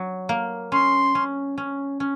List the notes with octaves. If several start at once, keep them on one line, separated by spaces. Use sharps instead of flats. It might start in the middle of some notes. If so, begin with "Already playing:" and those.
Already playing: F#3
A#3
C#4 C6
C#4
C#4
C#4